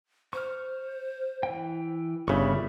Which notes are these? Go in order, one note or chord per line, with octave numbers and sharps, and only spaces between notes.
C5 C#6 F6
E3 G5
G1 C#3 G3 E5 B5 C#6